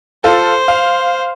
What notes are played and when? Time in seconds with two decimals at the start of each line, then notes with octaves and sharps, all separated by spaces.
0.24 F4 A4 C5
0.68 F5